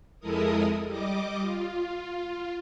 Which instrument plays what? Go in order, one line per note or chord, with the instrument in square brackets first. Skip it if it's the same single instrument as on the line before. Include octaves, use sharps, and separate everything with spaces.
[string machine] F2 G#3 E4 A4 A#4 D#6
G3 D#5 D6
F4